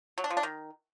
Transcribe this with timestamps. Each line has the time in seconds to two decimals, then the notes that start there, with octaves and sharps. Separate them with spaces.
0.18 F#3
0.24 D4
0.30 F3
0.37 D4
0.43 D#3